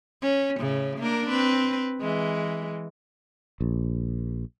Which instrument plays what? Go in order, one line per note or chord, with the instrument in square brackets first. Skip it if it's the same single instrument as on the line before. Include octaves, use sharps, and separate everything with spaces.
[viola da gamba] C#4
A2 C#3
A#3 D4 A#4
C4 B4
E3 G#3
[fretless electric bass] A#1